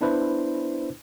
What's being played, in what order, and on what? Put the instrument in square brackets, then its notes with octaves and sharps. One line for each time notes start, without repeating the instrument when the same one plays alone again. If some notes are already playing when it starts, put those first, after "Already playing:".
[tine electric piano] B3 D4 E4 B4 C5